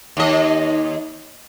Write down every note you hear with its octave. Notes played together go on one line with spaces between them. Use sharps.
D#2 D#5